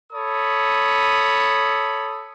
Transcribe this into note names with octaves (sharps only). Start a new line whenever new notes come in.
A4 C#5 B5 D#6